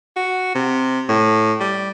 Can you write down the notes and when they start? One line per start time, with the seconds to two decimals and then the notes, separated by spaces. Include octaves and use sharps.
0.16 F#4
0.55 C3
1.09 A2
1.60 G3